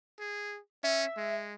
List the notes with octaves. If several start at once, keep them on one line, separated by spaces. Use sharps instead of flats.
G#4
C#4 E5
G#3